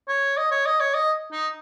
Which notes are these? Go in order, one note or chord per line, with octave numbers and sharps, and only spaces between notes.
C#5
D#5
C#5
D#5
C#5
D#5
D#4